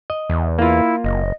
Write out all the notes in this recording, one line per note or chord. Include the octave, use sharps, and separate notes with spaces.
D#5
E2
A#3 E4 F4
F#1 D#5